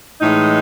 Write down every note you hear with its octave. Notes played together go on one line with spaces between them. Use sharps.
A2 E3 G#3 D#4